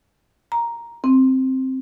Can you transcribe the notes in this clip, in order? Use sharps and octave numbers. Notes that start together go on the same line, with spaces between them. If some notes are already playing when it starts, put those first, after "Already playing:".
A#5
C4